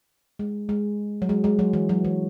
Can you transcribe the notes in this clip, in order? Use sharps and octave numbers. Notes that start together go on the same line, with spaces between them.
G#3
G#3
F#3
G#3
G#3
F#3
E3
F#3
E3